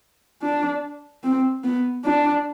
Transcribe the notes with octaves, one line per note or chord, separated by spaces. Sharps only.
D4
C4
B3
D4